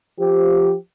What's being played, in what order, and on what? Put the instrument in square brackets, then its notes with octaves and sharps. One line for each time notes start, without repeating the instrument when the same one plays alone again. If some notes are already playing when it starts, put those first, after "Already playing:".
[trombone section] F3 G4